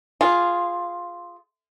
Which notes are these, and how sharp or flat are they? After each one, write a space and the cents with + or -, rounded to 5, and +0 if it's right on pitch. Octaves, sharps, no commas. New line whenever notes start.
F4 +0 G#4 +0